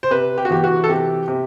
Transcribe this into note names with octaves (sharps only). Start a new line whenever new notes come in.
C5
C3 B4
G4
F#4
E3 G4
F#4
A4
C3 G4
C3